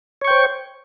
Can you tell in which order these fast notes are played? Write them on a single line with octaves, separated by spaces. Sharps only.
C#5 C#6 G5 C5